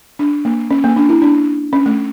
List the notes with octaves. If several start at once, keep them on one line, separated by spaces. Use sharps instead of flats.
D4
A#3
C#4
A#3
D4
E4
D4
C#4
A3